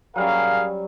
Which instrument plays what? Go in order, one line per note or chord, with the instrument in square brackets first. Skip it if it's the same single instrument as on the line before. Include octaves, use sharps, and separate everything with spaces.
[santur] F#3 G3 C#4 [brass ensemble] G#4 A#4 F5